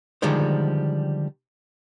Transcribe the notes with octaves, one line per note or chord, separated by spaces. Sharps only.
D3 D#3 F3 G3 G#3 C5